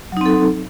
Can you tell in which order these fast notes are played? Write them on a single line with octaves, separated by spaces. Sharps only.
F#3 D#4 C4 A4